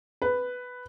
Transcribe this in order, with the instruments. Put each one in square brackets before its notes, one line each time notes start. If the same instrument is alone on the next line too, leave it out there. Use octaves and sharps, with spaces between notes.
[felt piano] B4